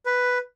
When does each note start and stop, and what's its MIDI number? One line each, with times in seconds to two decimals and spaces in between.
0.06 0.38 71